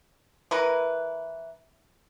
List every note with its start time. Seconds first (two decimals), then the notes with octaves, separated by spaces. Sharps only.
0.51 E3 A#4 B4